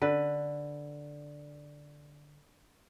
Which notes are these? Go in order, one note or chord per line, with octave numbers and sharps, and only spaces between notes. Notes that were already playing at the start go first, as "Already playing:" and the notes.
D3 B4